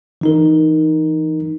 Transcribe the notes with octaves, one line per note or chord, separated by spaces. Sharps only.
E3 D#4 A#4